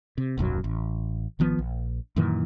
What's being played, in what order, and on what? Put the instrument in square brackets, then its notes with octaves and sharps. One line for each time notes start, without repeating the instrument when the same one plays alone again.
[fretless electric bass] C3
D#1 B1 F#2 F#3
A1
G#1 D#3 F3 B3
A#1
F#2 A#2 D#3 E3